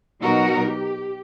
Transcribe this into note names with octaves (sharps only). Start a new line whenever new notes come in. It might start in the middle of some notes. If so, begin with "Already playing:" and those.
B2 F#3 D#4 F#4 A#4
G4